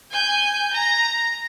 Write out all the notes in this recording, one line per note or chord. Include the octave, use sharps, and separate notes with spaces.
G#5 G6
A#5